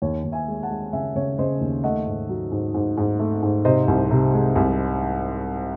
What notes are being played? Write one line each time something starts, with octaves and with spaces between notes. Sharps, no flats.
D#2 C#5
D#2
E5 G#5
G#3
F#5 A5
G#3
C#3 E5 G#5
C#3 C#5
C#3 C5 D#5
D#2
A3 D#5 F#5
G#2
F#3
G#2
G#2
G#2
A3
G#2
C3 C5 D#5
C2
C3
G#3
C2